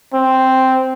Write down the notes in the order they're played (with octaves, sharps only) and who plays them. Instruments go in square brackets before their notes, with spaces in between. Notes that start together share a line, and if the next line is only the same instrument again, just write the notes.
[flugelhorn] C4